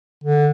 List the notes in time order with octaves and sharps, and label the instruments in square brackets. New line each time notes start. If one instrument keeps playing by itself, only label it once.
[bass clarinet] D3